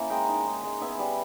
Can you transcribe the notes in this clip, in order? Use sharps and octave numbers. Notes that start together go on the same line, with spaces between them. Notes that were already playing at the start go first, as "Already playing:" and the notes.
Already playing: A#3 C#4 E4
G#3 G5 A#5
D#4
G#3
G#3
B3 E5 G#5
G3